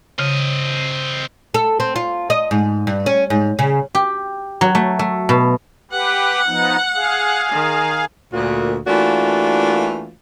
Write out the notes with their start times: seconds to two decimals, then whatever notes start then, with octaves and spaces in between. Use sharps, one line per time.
0.19 C#3 C4 D#5
1.54 A4
1.80 C4
1.96 F4
2.30 D#5
2.51 G#2
2.87 G2
3.06 C#4
3.30 G#2
3.59 C#3
3.95 G4
4.61 F#3
4.75 A3
4.99 A3
5.29 B2
5.91 G4 B4 F#5
6.47 F3 B3 D#4
6.95 G#4 F5
7.49 D#3
8.33 D2 A#2 F#4
8.86 E3 A3 A#3 D4 F4 F#4